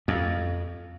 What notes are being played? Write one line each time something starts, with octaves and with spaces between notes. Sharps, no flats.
F2